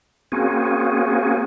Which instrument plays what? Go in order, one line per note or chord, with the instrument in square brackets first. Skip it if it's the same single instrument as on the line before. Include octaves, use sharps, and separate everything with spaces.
[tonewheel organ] A#3 C4 C#4 F#4 G#4